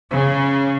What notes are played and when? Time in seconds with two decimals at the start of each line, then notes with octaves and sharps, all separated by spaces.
0.11 C#3